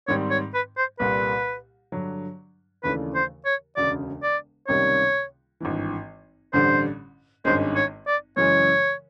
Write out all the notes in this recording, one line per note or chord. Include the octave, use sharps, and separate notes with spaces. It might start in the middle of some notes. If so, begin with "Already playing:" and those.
G#2 D#3 G3 C4 C#5
C#5
B4
C5
C2 A#2 G3 B4
G2 D3 F#3
D#2 C#3 E3 A3 D4 B4
C5
C#5
E1 D2 C#3 D5
D5
C#2 C3 D#3 G3 A#3 C#5
G#1 G2 E3
A1 G2 D3 G3 C5
G#1 G2 D#3 G#3 C#4 C5
C#5
D5
F#2 C#3 E3 G#3 C#4 C#5